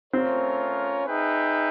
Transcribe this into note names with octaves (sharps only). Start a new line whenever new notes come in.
A3 C4 C#4 F4 A#4 C#5
D#4 G#4 B4 E5 G5